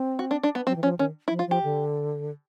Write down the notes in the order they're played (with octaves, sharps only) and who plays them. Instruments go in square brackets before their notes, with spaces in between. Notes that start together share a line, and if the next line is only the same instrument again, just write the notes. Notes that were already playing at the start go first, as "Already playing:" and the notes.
Already playing: [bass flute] C4
[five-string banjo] F#4
D4
D4
B3
[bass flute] F#3 [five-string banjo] C4
[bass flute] E3
[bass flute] F3 [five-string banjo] C#4
[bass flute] D#3 [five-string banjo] C#4
[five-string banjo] E4
[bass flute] F3
[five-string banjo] F4
[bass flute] F3 [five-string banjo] G4
[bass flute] D3